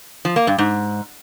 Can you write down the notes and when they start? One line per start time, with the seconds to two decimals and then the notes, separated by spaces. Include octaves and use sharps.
0.25 F3
0.36 A#3
0.47 G2
0.58 G#2